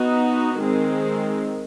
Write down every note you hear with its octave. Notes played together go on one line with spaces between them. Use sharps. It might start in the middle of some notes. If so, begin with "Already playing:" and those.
Already playing: B3 D#4 F#4
D#3 G#3 C4